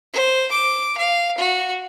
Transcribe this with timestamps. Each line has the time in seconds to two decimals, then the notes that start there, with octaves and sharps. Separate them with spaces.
0.13 C5
0.51 D6
0.98 F5
1.38 F#4